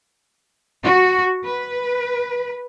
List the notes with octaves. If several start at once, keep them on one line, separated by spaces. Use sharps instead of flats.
F#4
B4